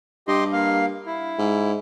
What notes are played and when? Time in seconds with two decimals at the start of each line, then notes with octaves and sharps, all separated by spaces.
0.28 G2 G4 D#5 C6
0.52 A#3 F5
1.06 E4
1.39 G#2